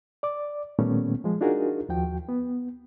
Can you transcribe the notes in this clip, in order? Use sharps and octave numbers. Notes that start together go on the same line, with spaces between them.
D5 D6
A#2 D#3 G3 A3 B3 C#4
F3 G#3
D4 D#4 F4 F#4 G#4 A#4
D#2 F3 F#4 G5
B3